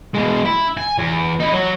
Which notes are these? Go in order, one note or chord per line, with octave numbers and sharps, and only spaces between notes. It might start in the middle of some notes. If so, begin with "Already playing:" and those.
B2 G#3
E4
G#5
E2
D#4 E4
F#3